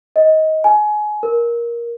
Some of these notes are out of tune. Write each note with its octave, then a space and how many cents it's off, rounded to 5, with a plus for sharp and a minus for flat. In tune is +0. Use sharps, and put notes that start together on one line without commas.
D#5 +20
G#5 +25
A#4 +15